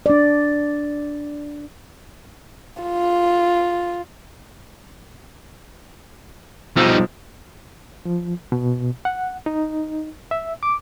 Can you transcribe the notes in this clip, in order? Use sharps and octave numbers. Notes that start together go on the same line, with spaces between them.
D4 D5
F4
B1 F3 G3 D#4 E6
F3
B2
F#5
D#4
E5
D6